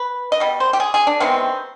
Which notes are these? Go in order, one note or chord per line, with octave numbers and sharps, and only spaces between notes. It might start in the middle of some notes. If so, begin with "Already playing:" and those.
Already playing: B4
D#5
B2 G3
C5
G4
G#4
G#4
D4
C3 D#3 G#3 B3 C4